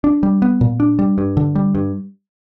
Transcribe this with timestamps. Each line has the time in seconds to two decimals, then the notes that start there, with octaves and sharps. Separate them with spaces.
0.04 D4
0.23 G3
0.42 B3
0.61 A#2
0.80 D4
0.99 G3
1.18 G2
1.37 D3
1.55 G3
1.75 G2